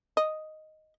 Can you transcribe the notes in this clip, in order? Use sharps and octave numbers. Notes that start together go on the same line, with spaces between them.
D#5